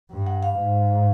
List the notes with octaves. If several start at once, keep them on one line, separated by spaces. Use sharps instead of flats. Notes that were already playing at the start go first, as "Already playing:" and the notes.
G2
F#5
F5
G#2